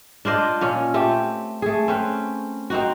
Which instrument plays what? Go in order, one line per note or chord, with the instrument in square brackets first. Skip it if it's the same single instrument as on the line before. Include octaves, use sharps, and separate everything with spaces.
[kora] D4 F4 C5 D#5
A#2 C#4
A3 C4 G4
A3 G#4
C4 C#4 B4
C4 D#4 F#4